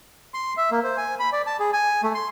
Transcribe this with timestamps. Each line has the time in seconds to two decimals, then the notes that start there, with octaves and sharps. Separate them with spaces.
0.34 C6
0.57 E5
0.71 A#3
0.84 C5
0.97 G#5
1.19 B5
1.33 D5
1.47 A5
1.60 G#4
1.73 G#5
2.03 A3
2.15 C6